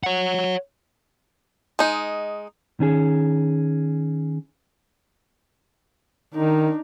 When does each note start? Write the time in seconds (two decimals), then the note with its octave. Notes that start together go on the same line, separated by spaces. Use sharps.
0.04 C#5 F#5
1.79 G#3 D#4
2.80 D#3 C#4 G#4
6.34 D#3 D4 D#4